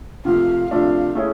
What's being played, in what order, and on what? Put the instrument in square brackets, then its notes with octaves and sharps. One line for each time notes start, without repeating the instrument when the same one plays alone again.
[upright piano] C3 F3 A3 [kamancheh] F5
[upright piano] C3 F3 A3 D4 [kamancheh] F5
[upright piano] A3 C#4 E4 G#4